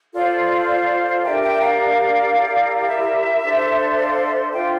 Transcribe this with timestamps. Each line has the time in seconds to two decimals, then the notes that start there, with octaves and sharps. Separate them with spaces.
0.13 F4 A4 C5 D5 F5
1.23 D4 G4 A#4 E5 G5
1.42 E5 G5
1.60 D5 F5
2.34 E4 G4 A#4
2.76 F5
2.88 E5
3.43 D4 A4 C5
3.98 D5 F5
4.25 E5
4.52 D4 F4 C5 E5 G5